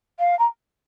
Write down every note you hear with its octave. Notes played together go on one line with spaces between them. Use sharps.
F5
A#5